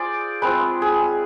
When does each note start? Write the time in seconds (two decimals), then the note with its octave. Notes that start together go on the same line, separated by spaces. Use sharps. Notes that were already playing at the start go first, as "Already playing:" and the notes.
Already playing: F4 G#4 C5 D5
0.42 G#3 C4 F4 B4
0.82 G#4